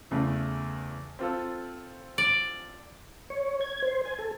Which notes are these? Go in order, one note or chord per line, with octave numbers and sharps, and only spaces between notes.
E2 C#3 A3
C4 F4 A4
D5
C#5
G#6
C5
G#5
A4